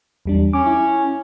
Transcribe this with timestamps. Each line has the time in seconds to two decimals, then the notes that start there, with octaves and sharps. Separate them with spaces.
0.26 E2 G3 D4
0.53 C#4 D6
0.66 E4